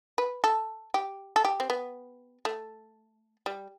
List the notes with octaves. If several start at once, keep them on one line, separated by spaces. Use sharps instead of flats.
B4
A4
G4
A4
G4
C4
B3
A3
G3